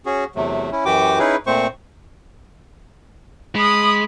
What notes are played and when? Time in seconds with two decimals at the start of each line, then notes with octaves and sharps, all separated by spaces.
0.06 C#4 F#4 G#4
0.35 E2 C3 F#3 A3
0.72 C#4 E4
0.85 F#2 E3 F#4 G4 G5 D6
1.19 C#4 D#4 E4 G#4 B4
1.47 A#2 A3 C4 C5 C#6
3.56 G#3 B5 D#6